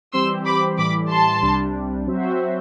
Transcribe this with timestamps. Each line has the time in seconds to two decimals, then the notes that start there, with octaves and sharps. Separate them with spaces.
0.13 E3 G3 C4 G4 C5 C6 E6
0.45 B5 D6
0.78 A2 E3 G3 B5 D6
1.10 A5 C6
1.42 C2 C3 G3 D4
2.07 F#3 C4 F#4 C5 E5